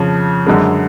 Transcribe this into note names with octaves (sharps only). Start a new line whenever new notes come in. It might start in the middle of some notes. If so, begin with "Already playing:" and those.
Already playing: F2 C#3 F3
F#2 D3 G#3